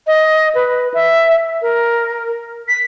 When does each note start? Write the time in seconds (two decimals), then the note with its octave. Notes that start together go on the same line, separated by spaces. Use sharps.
0.07 D#5
0.55 B4
0.94 E5
1.62 A#4
2.68 B6